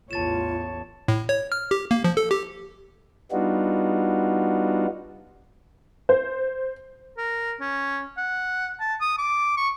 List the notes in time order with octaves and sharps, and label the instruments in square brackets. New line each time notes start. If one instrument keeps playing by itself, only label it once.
[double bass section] A1 E2 [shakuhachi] F4 [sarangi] C#5 [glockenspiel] A5 A6 E7
[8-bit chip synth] A2
C#5
F6
G4
A#3
F3
A4
G4
[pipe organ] G3 B3 D4 D#4 F4 F#4
[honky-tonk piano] C5
[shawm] A#4
C#4
F#5
A5
D#6
D6
C#6